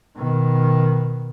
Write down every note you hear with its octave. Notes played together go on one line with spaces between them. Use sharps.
B2 D#3